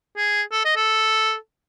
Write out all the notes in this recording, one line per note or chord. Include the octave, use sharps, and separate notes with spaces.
G#4
A4
D#5
A4